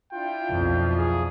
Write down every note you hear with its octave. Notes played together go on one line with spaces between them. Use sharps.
D4 E4 F4 G5
B1 F2
G#4